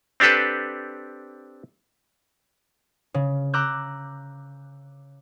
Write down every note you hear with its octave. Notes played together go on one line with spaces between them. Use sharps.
C4 D4 G4 A4 B4
C#3
A#5 D6 E6 F#6 G6